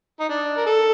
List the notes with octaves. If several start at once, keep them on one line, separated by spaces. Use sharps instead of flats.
D#4
D4
A#4
A4